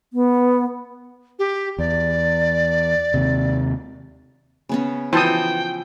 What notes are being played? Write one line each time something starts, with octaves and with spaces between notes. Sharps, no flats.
B3
G4
E2 D5
D#2 C3
C#3 B3 C#4
E3 F3 F#4 C5 G5 A5 D#6